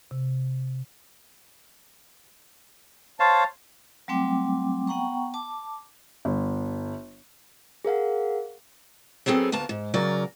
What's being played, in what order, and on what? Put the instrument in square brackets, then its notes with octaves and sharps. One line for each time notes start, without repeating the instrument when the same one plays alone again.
[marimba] C3
[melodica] C5 C#5 F5 [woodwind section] A5
[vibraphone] F#3 G3 A3 C4 G5 D6
B3 F#5 G5 A#5 C#6
A5 D6
[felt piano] G1
[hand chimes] G#4 A#4 F5 F#5
[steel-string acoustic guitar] F#3 B3 C4 G#4 A4
D2 A#3 B3 A5
G#2
C#3 F#3 A#4 D5